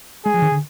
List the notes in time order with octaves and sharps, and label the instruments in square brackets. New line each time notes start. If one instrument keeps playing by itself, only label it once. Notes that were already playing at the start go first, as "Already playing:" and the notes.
[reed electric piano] G#3 [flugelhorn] G#4
[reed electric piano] F3
D#3
D3